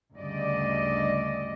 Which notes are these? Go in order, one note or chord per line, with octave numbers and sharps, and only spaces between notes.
D2 G2 C#3 D5 D#5